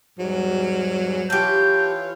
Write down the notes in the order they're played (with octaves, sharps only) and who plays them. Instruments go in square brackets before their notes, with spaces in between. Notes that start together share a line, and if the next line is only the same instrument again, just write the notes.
[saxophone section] E2 G#2 G3 [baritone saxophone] F#3
[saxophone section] E3 F4 C#5 [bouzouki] G4 A4 [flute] G6